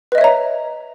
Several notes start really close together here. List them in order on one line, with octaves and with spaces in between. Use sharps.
B4 D#5 E5 C#5 A#5